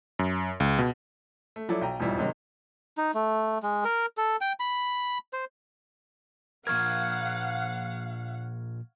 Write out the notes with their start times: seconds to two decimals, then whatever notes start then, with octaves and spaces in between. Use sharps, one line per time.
0.19 F#2
0.60 C#2
0.78 B2
1.56 A3
1.69 F3 F#3 E4 A4 D5
1.81 B1 G5 A#5
2.00 E1 F2 G#2 F3 G3 E4
2.19 C3 D#3 F#3 G#3 C#4
2.98 D#4
3.14 A3
3.63 G#3
3.85 A#4
4.17 A4
4.41 G5
4.60 B5
5.33 C5
6.67 A#2 F3 A#4 F5 F#5 C#6 F6 G#6